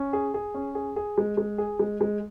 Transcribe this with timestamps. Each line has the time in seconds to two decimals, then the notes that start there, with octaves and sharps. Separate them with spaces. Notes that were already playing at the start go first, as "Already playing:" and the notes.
Already playing: C#4
0.13 G#4
0.34 G#4
0.54 C#4
0.75 G#4
0.96 G#4
1.18 G#3
1.37 G#3
1.58 G#4
1.79 G#3
2.01 G#3